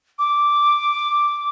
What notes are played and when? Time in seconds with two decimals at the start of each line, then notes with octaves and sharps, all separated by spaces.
0.19 D6